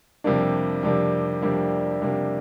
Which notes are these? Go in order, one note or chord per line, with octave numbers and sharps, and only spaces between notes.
F2 C3 G3 A#3 D4
F2 C3 G3 A#3 D4
F2 C3 G3 A#3 D4
F2 C3 G3 A#3 D4